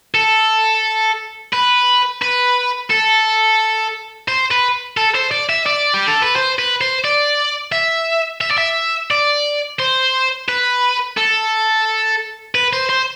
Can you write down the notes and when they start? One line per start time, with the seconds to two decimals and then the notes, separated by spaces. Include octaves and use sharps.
0.15 A4
1.53 B4
2.22 B4
2.90 A4
4.28 C5
4.51 B4
4.97 A4
5.15 C5
5.31 D5
5.50 E5
5.66 D5
5.94 G4
6.08 A4
6.22 B4
6.36 C5
6.59 B4
6.81 C5
7.05 D5
7.72 E5
8.41 E5
8.51 D5
8.58 E5
9.11 D5
9.79 C5
10.49 B4
11.17 A4
12.55 B4
12.73 C5
12.89 C5